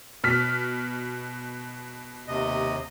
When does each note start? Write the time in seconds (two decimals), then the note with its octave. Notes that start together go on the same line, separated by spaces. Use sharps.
0.24 B2 F6 B6
2.28 D#2 C3 D#5